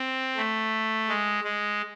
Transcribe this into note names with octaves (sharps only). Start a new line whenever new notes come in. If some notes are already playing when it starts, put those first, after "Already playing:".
Already playing: C4
A3
G#3
G#3